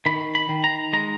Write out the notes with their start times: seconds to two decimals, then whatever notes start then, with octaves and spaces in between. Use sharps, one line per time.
0.06 D#3 B5
0.35 B5
0.49 D#3
0.64 A#5
0.93 G#3 A#5